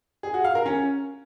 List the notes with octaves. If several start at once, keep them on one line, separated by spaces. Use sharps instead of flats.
G#4
F#4
F5
A#4
C#4